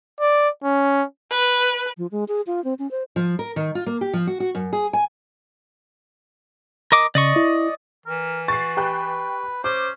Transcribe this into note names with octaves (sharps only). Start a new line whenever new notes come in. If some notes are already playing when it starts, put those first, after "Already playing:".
D5
C#4
B4
F3
G#3
G#4
F4
C4
C#4
C5
F3
A#4
D#3
F4
A#3
G4
F3
F#4
F#4
F#2
G#4
G#5
A#4 D#5 D6
C#3 D5 D#5 C#6
E4
E3 A#4
F#4 C#6 A6 C7
G4 B4 G5 F#6
C#4 C5 D6